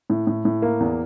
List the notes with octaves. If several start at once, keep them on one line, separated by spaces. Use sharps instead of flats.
A2
A2
A2
A#3
E2